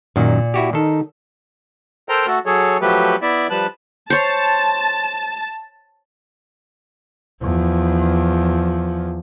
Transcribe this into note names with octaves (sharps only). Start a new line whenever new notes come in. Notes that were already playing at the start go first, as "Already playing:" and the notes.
F#2 A#2 D#3
E4 F#4 G4
D#3 D#4 A4
A4 A#4 C5 G5 A#5
A3 F#4 A4
F#3 G#4 A4 C#5
F3 F#3 A3 G4 B4
B3 E4 D5 E5
F3 G3 B4 A5 F#6
C5 C#5 A5
E2 F3